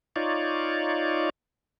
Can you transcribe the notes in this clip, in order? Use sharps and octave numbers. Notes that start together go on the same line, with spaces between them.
D#4 F4 C#5 D5